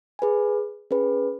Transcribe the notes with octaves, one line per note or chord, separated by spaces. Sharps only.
G#4 B4 G#5
C#4 G#4 B4